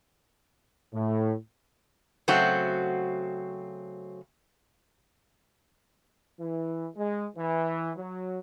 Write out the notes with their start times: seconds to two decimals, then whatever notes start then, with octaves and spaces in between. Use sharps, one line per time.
0.94 A2
2.28 C#3 F#3 A3 C4 F#4
6.39 E3
6.96 G#3
7.36 E3
7.95 F#3